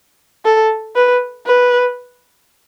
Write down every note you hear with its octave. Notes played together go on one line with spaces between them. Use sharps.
A4
B4
B4